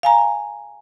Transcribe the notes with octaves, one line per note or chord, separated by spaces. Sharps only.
F5 G#5 A#5